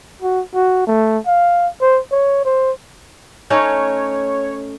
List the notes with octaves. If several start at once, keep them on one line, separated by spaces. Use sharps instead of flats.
F#4
F#4
A3
F5
C5
C#5
C5
A3 C#4 D#4 C#5